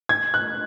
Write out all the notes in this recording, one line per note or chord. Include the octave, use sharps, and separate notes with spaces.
G#6
F#6